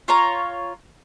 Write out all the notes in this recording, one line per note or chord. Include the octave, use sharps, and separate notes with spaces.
F4 C#5 A#5